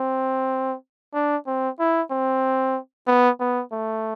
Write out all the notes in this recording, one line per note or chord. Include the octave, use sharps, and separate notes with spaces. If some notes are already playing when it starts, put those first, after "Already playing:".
Already playing: C4
D4
C4
E4
C4
B3
B3
A3